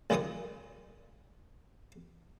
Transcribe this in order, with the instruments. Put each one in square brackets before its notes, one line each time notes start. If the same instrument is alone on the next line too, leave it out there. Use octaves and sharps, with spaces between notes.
[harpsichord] C#2 F#2 D#3 D#5 C#6 D#6